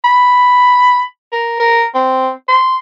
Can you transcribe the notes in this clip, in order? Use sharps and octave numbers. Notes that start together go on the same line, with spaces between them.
B5
A#4
A#4
C4
C6